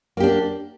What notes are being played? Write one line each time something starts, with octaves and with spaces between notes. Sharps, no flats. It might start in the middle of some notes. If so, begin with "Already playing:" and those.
A#3 D4 G4